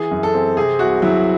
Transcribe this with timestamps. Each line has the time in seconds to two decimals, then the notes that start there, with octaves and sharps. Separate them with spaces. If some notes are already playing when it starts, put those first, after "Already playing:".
Already playing: E3 G#4
0.11 F#2
0.23 A4
0.34 C4
0.57 C3 G#4
0.79 C2 F#4
1.02 F#3 E4